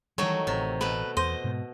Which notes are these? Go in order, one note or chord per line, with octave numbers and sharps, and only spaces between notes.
D#3 E3 F#3 G3 A3 C#5
A1 C3
B2 A3 B4
E2 C5 D#5
G#2 B2